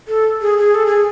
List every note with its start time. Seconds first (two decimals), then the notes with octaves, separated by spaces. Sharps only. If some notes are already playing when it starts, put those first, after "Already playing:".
0.08 A4
0.42 G#4
0.58 G#4
0.74 A4
0.86 G#4